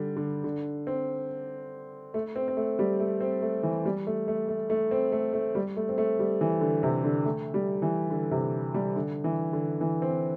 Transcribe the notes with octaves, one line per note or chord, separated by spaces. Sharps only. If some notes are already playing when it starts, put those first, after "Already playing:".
Already playing: D3 G3
D3
D3
C4
A3
C4
C4
A3
G3
A3
C4
A3
E3
G3
A3
A3
A3
A3
C4
A3
A3
G3
A3
C4
A3
G3
E3
D3
C3
D3
A3
G3
E3
D3
C3
G3
D3
E3
D3
E3
C4